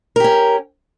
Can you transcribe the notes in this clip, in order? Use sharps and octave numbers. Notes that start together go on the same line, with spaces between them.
C#4 G4 A#4